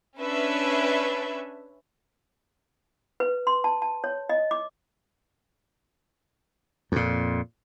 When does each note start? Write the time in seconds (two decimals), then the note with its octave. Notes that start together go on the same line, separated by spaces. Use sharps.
0.20 C#4 D4 B4 E5
3.20 B4
3.47 C6
3.64 A5
3.82 A5
4.04 C#5
4.29 D#5
4.51 D6
6.92 F2 A#2